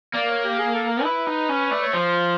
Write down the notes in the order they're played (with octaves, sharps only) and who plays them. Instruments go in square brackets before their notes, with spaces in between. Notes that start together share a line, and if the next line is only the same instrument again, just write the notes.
[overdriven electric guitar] A#3 [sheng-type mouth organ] D5
[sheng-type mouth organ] C#5
G4
G#4
A4
A#4
[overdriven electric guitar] E4 [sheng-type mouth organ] B4
[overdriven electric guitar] D#4
C#4
[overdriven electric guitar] A3 [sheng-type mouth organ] D5
[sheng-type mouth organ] C#5
[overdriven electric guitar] F3 [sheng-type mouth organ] C5